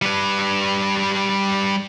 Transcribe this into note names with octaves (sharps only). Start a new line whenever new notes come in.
G3 B4